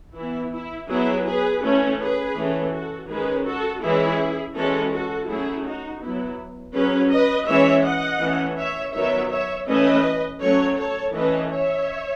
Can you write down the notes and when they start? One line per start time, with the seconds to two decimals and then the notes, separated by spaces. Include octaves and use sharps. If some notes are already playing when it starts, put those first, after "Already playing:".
0.16 E3 B3 E4
0.54 E4
0.90 F#3 B3 E4 G#4
1.26 G#4 B4
1.63 E3 A3 C#4
2.00 G#4 B4
2.37 E3 A3 C#4
2.73 F#4 A4
3.09 D#3 G#3 C#4 G#4 B4
3.46 F#4 A4
3.82 E3 G#3 C#4 E4 G#4
4.55 E3 G#3 C#4 F#4 A4
4.92 F#4 A4
5.28 F#3 A3 C#4 E4 G#4
5.65 D#4 F#4
6.02 F#3 B3 E4
6.75 F#3 C#4 G#4 B4
7.12 B4 D#5
7.48 E3 G#3 C#4 C#5 E5
7.85 D#5 F#5
8.22 E3 A3 C#4
8.58 C#5 E5
8.94 D#3 F#3 B3 C#5 E5
9.31 C#5 E5
9.67 E3 A3 C#4 B4 D#5
10.41 F#3 A3 C#4 A4 C#5
10.78 A4 C#5
11.14 E3 A3 C#4 B4 D#5
11.50 C#5 E5